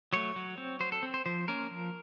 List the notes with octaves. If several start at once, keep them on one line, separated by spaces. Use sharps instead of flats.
F#3 A3 C#5
F#3
C4
F#3 C5
A4
C4
C5
F3 C5
A#3 C#4 A#4
F3